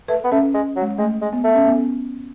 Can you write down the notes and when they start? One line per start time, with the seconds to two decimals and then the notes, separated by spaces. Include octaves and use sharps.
0.08 A3 B4
0.24 B3
0.32 A3 C#4
0.54 G#3
0.76 F#3
0.81 G#3
0.98 G#3 A3
1.21 G#3
1.33 B3
1.44 A3
1.55 C#4
1.67 B3